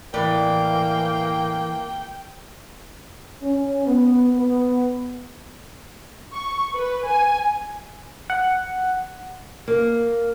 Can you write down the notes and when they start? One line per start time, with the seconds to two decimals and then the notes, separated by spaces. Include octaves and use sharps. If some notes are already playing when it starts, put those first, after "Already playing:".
0.14 A2 E3 A#3 B4 D5 G5
3.42 C#4
3.86 B3
4.37 B3
6.34 C#6
6.74 B4
7.06 G#5
8.30 F#5
9.68 A#3